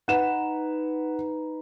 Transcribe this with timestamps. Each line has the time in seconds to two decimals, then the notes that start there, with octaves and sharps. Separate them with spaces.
0.08 D#4 B4 F#5 E7